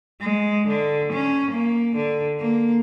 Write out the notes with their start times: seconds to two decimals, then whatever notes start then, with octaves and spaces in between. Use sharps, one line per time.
0.21 G#3
0.68 D3
1.13 C#4
1.51 A#3
1.96 D3
2.39 A#3